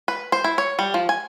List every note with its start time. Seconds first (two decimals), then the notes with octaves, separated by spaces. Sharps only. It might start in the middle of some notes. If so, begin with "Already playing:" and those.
0.08 B4
0.32 C5
0.44 E4
0.58 C#5
0.79 G3
0.94 F3
1.09 G#5